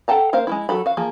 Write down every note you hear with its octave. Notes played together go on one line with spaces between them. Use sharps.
A4 F#5 G5 A5 A#5
A#3 A#4 C5 F5
G#3 A#3 E4
F#3 F#4 A4 B5
F#4 F5
F3 A#3 G#4